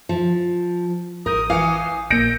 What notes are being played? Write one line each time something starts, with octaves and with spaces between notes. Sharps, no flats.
F3
A1 A#4 D#6 G6
E3 F5 C#7
A#1 A#3 E6 G6 A#6 D7